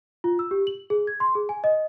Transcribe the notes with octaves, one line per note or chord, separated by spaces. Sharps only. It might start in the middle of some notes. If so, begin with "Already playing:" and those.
F4
E6
G4
F#7
G#4
G#6
C6
G#4
G#5
D#5